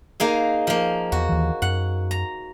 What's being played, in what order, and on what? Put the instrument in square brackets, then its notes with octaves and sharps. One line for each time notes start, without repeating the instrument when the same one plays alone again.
[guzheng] A#3 D#4 G#4
F3 A#3
[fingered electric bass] E2 [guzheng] F#4
[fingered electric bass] D#2 E3
[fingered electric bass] F#2 [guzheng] F#5
[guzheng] A#5